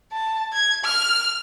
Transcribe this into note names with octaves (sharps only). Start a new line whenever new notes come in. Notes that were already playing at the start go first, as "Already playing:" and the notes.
A5
G#6
F6